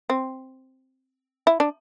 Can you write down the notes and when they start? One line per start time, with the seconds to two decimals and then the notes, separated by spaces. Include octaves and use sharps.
0.10 C4
1.47 E4
1.60 D4